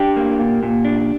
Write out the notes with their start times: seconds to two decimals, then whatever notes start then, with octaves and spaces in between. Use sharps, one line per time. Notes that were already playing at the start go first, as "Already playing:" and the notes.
Already playing: D4 G4 G5
0.16 A#3
0.40 A#2
0.63 A#2
0.85 D4